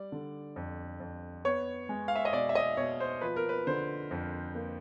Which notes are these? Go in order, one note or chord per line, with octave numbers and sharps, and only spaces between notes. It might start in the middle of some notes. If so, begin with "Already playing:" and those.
Already playing: G3 D5
D3
F2
F2
B3 C#5
G#3
F5
E5
D#5
B2 D5
E5
D#5
B2 C#5
C5
F3 B4
A#4
B4
D3 C5
F2
A#3